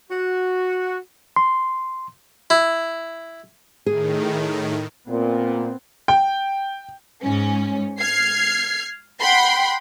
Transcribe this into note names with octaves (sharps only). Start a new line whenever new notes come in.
F#4
C6
E4
A2 D#3 G#4
A#2 B3 C4
G5
G#2 C#4
F6 G#6 C7
F#5 G5 B5 C6